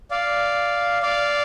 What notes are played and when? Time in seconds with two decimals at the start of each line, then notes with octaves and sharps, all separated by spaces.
0.11 D5 F5
1.02 D5 F5